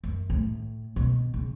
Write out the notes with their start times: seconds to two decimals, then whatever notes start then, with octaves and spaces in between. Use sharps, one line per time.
0.04 F#2
0.30 A2
0.96 B2
1.34 C#3